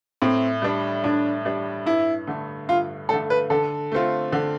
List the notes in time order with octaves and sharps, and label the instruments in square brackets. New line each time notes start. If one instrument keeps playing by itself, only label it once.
[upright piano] A2 [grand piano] C4
[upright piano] G3 D4
[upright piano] A2 [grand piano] D4
[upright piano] G3 D4
[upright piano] G2 [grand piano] E4
[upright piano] D3 A3
[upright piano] G2 [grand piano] F4
[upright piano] D3 A3 [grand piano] A4
[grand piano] B4
[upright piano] D3 [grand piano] A4
[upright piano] A3 C4 F4
D3